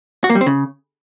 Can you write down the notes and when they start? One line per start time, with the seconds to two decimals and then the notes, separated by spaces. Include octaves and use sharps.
0.24 F#4
0.30 A#3
0.35 G3
0.41 C4
0.46 C#3